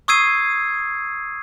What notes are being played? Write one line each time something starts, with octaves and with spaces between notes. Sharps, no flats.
C#6 D#6 E6 G#6 C7 D#7